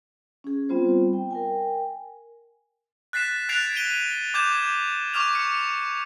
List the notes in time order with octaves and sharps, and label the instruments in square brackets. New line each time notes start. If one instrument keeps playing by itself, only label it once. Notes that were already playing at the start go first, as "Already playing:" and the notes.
[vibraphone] C#4 G#4
G3 B3 C4 F4 C5
G5
A#4 G5 G#5
[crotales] F#6 A6 B6 C7 E7
F#6 G#6 A6 C7 D7 F7
G#6 D7 D#7 G7
D6 G6 G#6 E7
C#6 D6 F6 F7
C#7